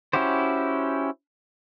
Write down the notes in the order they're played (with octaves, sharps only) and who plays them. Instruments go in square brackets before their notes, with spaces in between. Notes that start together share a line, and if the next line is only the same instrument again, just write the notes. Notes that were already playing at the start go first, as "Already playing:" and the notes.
[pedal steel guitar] C#4 E4 F#4 G4 C5